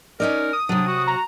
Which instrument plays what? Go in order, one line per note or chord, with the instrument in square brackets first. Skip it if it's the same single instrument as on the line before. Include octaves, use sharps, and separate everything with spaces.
[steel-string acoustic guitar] C#4 D#4 D5 [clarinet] A#4
[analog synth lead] D#6
[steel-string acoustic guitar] C3 F#3 [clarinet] D4
[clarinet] F#4
[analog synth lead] A#5